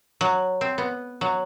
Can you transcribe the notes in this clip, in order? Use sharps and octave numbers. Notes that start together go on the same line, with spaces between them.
F#3
C4
B3
F#3